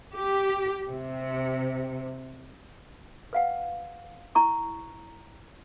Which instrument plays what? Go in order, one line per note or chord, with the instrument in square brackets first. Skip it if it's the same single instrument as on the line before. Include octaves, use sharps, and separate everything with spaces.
[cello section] G4
C3
[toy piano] B4 F5 F#5
E4 A#5 C#6